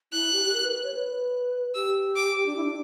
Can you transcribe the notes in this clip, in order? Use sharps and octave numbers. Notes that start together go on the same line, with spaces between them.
E4 F#6
G4
G4
A#4
B4
B4
C#5
B4
G4 E6
D6
D4
E4
D4